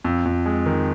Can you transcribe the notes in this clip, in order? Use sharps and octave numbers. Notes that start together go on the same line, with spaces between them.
F2
F2
G#3
D#3